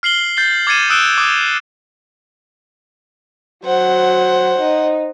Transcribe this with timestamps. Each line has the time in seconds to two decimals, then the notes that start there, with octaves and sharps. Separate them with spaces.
0.03 F6 C7 F#7 G7
0.37 G6 A6 C7 G7
0.67 D6 G#6 A6 C#7 D#7 E7
0.90 D#6 E6 F#6 D7 E7 G7
1.18 D6 D#6 G6
3.65 F#3 C5 F#5
4.59 D#4